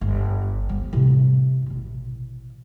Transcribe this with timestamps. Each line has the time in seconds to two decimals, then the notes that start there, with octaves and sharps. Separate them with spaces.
0.01 G1
0.69 G3 B3
0.93 A2 C3
1.66 A1 B2